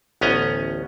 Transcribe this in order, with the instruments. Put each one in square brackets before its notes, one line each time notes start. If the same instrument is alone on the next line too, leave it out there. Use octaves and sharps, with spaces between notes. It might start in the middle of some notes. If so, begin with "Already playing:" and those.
[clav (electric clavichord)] A1 D2 B3 C#4 D#5 A#5